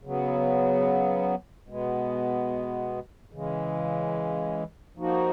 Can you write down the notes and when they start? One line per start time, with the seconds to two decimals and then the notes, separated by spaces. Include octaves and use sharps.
0.03 C#3 F#3 B3
1.68 B2 G#3 B3
3.32 C#3 E3 G#3
4.97 F3 A#3 D#4 F#4